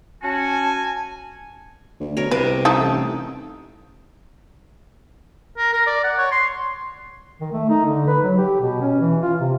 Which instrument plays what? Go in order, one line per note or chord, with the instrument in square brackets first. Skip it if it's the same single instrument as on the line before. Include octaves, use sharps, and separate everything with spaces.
[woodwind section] C#4 F#4 [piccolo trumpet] G#5 [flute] A5
[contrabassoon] D2
[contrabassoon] B2 [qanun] A#4 C#5
[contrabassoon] C2 [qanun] C3 [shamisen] B4
[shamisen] D#4 E4 A4
[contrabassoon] A1
[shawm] A#4
A#4
D5
F#5
C#5
C6
[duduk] D#3
A3
D#4
D3
B4
F#3
G4
B2
C#4
E3
F4
C3